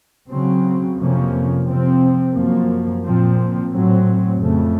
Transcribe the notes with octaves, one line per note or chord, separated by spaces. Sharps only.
C#3 F#3 C4
F2 C3 F3 A#3 C#4
C3 F3 C4
F#2 F3 A#3
A#2 F3 C4
A2 F#3 C4
F2 C#3 A3